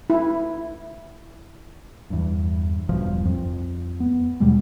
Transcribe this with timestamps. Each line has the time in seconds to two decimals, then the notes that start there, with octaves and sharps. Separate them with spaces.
0.10 E4
2.10 E2 G2
2.89 E1 B1 G2 F3
3.25 F2
4.00 B3
4.40 D#2 B2 G3 G#3